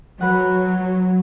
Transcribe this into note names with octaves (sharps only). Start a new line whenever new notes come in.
F#3 B4 F#5